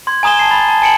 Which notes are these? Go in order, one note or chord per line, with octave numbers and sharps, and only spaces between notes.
C6 G#6
G#5 A#5 D#6 G#6 E7 G7
A5 C7 E7
B5 A6
A5
G#5 A5 C#7 D7 E7 F#7